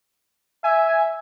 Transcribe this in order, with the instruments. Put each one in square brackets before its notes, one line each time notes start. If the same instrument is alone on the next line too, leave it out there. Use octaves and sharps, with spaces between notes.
[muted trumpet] E5 [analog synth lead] G#5